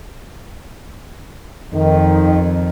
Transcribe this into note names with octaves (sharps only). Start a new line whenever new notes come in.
F2 D#3